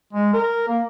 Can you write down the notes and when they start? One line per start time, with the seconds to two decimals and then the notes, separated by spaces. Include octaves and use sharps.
0.13 G#3
0.34 A#4
0.68 A#3